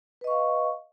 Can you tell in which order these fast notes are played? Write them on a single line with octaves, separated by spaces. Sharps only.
B4 D#5 C#6 F5